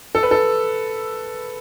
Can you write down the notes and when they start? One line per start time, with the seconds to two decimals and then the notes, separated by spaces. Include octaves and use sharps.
0.15 A4
0.23 B4
0.31 A4